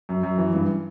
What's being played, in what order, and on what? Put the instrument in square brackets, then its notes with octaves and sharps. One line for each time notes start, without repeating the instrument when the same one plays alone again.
[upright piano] F#2
F#2
E3
G2